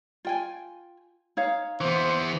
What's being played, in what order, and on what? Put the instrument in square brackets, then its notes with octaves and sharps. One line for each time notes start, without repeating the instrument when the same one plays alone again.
[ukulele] F4 G5 G#5
D#4 C#5 F5
[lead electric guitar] E3 B3 [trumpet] C5